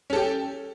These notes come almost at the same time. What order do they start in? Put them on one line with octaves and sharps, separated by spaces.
C#4 A4 G4